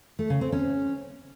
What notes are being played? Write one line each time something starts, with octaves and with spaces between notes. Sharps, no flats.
A3
C#3
C4
C#4